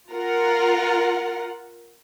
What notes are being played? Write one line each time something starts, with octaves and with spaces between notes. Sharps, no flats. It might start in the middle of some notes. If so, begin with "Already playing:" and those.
F4 A#4 F#5